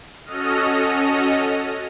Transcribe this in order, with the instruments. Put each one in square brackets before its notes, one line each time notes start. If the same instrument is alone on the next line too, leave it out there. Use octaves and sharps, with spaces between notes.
[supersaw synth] C#4 F#4 A4 D#5 D#6 F6